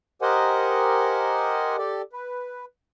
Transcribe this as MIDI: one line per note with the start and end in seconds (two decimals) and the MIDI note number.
0.22 1.76 67
0.22 1.76 70
0.22 1.76 72
0.22 1.76 75
0.22 1.76 78
0.22 1.76 80
1.78 2.02 67
1.78 2.02 69
1.78 2.02 74
2.13 2.65 71